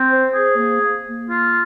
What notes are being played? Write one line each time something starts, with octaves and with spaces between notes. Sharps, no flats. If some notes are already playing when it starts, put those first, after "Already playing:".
Already playing: C4
C5
G#4
A#3
A#3
A#3
F4